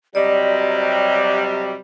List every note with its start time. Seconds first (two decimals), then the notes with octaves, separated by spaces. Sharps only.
0.15 C3 F#3 G3 D5 D#5